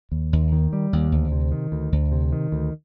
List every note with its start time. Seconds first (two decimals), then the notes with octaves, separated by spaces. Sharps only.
0.12 D#2
0.33 D#2
0.52 D#3
0.73 G3
0.93 D#2
1.12 D2
1.32 C3
1.52 D#3
1.72 D2
1.92 D2
2.12 C3
2.32 D#3
2.52 D2